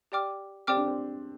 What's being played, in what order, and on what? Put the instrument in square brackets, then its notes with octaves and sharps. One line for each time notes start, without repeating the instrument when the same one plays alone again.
[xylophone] G4 D5 G5 D6 F6
[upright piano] C4 [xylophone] G4 D5 G5 D6 F6
[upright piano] D4
C4